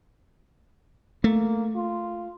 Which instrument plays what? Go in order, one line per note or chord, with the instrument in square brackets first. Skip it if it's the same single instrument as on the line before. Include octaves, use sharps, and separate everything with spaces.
[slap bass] A3 [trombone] A#3
[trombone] F4